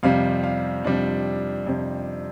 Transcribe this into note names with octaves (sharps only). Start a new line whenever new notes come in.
F2 C3 G3 F5
F5
F2 C3 G3 D4
F2 C3 G3